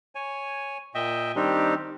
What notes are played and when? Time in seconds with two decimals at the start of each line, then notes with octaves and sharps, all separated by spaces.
0.15 C#5 G#5
0.95 A#2 D#5 E5 G5
1.36 D#3 G3 C4 D4 D#4 G4